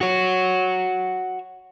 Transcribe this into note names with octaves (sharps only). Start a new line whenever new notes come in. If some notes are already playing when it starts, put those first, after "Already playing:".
F#4 C#5